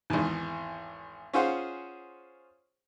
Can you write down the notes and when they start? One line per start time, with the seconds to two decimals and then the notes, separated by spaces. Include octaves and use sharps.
0.10 G#1 E2
1.33 C#4 F4 G#4 C5 F#5